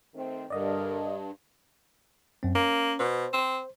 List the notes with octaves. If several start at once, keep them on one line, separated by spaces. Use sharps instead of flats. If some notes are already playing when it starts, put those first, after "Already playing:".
D#3 A3 C4
G2 D3 A#4 D5 D#5
F#2 C4
A#3 C#4
B2 C5
C4